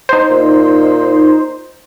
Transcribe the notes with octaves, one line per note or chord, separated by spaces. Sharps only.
D#4 C5
A#2